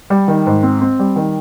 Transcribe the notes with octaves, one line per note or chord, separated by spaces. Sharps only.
G3
D#3
G#2
C4
C4
G3
D#3